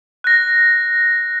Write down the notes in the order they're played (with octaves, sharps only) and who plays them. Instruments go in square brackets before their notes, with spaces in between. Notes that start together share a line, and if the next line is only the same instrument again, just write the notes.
[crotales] F#6 A#6